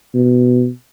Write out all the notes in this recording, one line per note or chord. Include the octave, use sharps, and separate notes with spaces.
B2